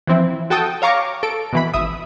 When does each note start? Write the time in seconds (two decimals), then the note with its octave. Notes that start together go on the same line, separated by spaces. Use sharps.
0.07 E3 F3 C4 E4
0.50 F#4 A4 G5 A5 D#6
0.82 C#5 F5 A#5 C#6 D6
1.23 A4 D7
1.53 B2 E3 B5
1.74 G#1 E5 D#6